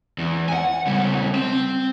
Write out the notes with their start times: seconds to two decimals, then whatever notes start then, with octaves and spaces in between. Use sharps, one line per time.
0.18 E2
0.49 F#5 G#5
0.87 C#3 G3
1.35 C4